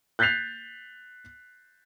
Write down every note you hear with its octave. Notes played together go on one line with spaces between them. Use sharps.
F#6 G6 A6 B6 C7 F7